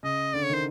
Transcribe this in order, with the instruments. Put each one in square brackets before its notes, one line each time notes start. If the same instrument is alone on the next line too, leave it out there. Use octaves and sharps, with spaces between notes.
[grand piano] C#3 [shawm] D#5
[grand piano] D3 [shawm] D5
[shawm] C#5
[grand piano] D#3 [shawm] C5